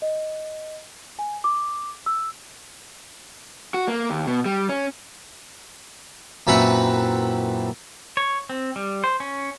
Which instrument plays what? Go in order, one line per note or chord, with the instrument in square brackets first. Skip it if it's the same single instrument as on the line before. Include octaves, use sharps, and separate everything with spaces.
[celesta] D#5
G#5
D6
E6
[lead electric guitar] F#4
A#3
D#2
B2
G3
C#4
[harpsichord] F#2 A#2 C4 E4 B4 F#5
[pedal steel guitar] C#5
C4
G3
C5
C#4